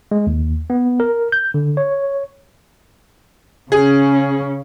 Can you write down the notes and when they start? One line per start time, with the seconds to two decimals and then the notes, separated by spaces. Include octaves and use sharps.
0.11 G#3
0.27 D#2
0.70 B3
1.00 A#4
1.32 G6
1.54 D3
1.77 C#5
3.72 C#3 C#4 G#4